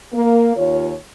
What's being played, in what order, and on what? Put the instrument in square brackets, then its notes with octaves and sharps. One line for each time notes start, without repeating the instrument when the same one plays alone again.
[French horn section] A#3
D#2 F4 C#5